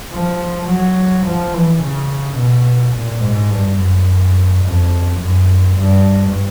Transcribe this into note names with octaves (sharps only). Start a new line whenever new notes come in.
F3
F#3
F3
E3
C#3
B2
A#2
G#2
G2
F#2
F2
F#2
G2